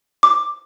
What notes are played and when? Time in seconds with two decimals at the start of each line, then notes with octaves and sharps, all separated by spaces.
0.23 D6